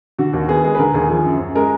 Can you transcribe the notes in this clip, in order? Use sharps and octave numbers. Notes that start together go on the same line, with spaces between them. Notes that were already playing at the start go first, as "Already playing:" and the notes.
D3 F#4
D#2 F#4
B3 G#4
G#3 G#4
B4
D3 A#4
D#2 G#4
F3 G#4
F#2
F#2
G#3 A#4